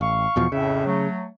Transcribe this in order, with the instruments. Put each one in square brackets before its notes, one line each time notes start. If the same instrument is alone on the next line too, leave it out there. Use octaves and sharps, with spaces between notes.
[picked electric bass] A1 [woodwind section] F5 C#6
[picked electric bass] E2 B2 F3
[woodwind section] F2 A2 E5 [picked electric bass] C#3
[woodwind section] F#3 A3